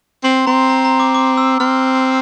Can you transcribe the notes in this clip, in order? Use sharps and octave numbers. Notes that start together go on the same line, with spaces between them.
C4 C6
C4 A#5
A#5
A#5
D6
D6
E6
C4 F6